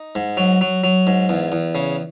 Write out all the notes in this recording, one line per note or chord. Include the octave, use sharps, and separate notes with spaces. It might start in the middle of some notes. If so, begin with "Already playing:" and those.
Already playing: D#4
G#2
F#3
F#3
F#3
G#2
E2
E2
C#3